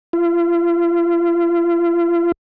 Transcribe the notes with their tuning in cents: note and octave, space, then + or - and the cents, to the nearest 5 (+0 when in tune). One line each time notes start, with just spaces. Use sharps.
F4 -40